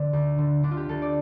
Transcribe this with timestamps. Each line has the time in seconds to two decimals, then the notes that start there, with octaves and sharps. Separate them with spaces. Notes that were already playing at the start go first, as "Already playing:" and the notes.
Already playing: D3 C4 D4
0.13 D2
0.38 D3
0.63 D3 D4
0.71 F4
0.77 G4
0.89 D2 A4
1.02 D5